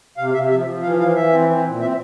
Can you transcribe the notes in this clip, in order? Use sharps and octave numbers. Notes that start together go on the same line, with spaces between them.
C3 F5
C3 E5
F3 E5
F3
E3 F5
E3 F5
E3 E5
C4
C4
A#2
C4 E5